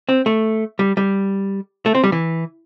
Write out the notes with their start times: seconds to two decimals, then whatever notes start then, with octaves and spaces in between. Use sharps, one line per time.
0.09 C4
0.26 A3
0.79 G3
0.97 G3
1.86 A3
1.95 C4
2.03 G3
2.12 E3